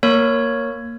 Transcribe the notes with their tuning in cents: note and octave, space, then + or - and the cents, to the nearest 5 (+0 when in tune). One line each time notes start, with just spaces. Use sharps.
A#3 +0 A#4 +0 C#5 +0